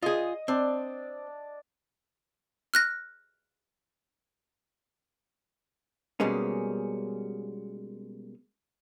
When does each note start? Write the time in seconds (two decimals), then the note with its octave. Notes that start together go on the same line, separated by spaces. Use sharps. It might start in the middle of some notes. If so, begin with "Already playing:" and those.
0.02 F4 G#4 D#5
0.48 C4 D4 D5
2.74 F6 F#6 A#6
6.20 B2 G3 G#3 A#3 C#4